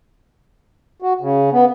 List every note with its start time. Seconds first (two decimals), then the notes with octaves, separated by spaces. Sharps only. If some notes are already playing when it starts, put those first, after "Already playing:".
1.02 F#4
1.21 C#3
1.52 B3